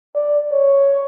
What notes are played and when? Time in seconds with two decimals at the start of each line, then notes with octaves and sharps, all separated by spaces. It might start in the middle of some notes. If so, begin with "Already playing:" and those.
0.15 D5
0.52 C#5